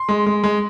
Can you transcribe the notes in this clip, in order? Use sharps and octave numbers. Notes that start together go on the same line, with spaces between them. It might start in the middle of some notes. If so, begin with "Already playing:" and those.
Already playing: C6
G#3
G#3
G#3